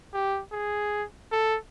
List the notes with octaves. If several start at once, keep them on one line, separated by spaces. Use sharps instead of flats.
G4
G#4
A4